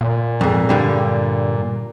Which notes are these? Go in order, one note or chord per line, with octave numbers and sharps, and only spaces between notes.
A#2
F2 G#2
G2 D3 G3